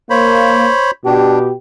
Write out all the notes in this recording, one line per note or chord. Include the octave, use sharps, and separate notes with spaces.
A#3 C5 C#5 B5
B2 D4 G4